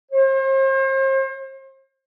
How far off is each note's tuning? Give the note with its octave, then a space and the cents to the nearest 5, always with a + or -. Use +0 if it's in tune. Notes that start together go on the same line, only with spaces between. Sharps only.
C5 +40